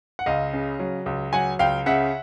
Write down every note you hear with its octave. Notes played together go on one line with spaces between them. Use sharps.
F#5
C#2 D#5 F5
C#3
F#3
C#2
F#3 F#5 G#5
C#2 F5 G5
C#3 E5 F#5